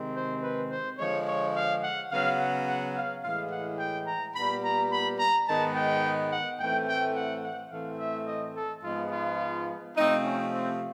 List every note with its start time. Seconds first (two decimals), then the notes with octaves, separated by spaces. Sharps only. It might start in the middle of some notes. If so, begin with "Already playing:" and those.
Already playing: C3 D#3 G#3 C4
0.15 C5
0.42 B4
0.70 C5
0.98 D3 F3 G#3 C#5
1.27 C#5
1.55 F5
1.83 F#5
2.11 C#3 F#3 B3 F5
2.40 F#5
2.68 F#5
2.95 F5
3.22 A2 E3 G#3 F5
3.51 F#5
3.79 G5
4.07 A#5
4.35 A#2 G3 B3 B5
4.64 A#5
4.92 B5
5.19 A#5
5.47 G#2 D#3 G#3 B3 A5
5.75 G5
6.32 F#5
6.59 A2 E3 A3 C4 G5
6.87 G5
7.16 F#5
7.44 F#5
7.71 A2 E3 A3 C4 F5
7.99 E5
8.27 D#5
8.56 A4
8.83 G#2 F3 G#3 B3 F4
9.11 F4
9.95 C3 F3 A3 C4 D#4
10.24 C#4
10.52 C4